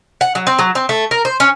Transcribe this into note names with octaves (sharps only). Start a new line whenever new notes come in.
F#5
F#3
C4
F#3
C4
A3
A#4
C5
C#4